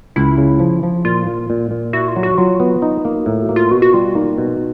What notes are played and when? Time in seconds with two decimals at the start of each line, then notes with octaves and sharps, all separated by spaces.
0.16 C#2 E4
0.38 C#3
0.60 F3
0.83 F3
1.05 A#2 F4
1.27 A#2
1.50 A#2
1.71 A#2
1.93 E4 F#4
2.08 F4
2.16 F#3
2.23 F#4
2.38 F#3 F4
2.60 B3
2.82 D#4
3.05 A#3
3.16 F#4
3.26 A2 F4
3.42 F#4
3.49 A#3
3.56 F4
3.71 B2 F#4
3.82 F#4
3.93 G3 F4
4.15 A#3 D#4
4.38 B2